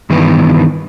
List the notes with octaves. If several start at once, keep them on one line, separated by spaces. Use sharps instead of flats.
G2 D#3 E3 B3